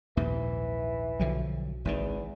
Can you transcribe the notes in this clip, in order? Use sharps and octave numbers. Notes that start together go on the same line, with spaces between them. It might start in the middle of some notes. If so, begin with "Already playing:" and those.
A#1 D#2 G#2 E3
B1 D3 F3 F#3
G#1 E2 G#2 D#3